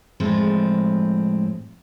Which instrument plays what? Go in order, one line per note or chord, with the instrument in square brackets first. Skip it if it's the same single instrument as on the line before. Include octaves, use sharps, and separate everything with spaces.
[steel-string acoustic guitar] A2 F3 G#3 C4